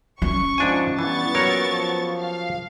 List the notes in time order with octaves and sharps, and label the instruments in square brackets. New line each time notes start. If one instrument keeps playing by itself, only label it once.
[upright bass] C#4 [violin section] C#6
[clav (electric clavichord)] G#2 D4 G#5 [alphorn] F3
[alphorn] G2 [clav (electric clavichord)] E3 [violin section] B3 C#6 A6
[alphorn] A#2 [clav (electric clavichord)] F#3 A#4 C#5
[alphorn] F3
[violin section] F5